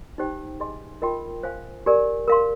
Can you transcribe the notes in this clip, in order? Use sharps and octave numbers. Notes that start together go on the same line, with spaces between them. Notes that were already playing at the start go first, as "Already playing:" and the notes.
D#4 G4 C5 G5
G#4 D#5 G#5 C6
F4 A#4 D#5 G5 C6
C5 F5 G#5
G4 A#4 D5 G#5
A#4 F5 C6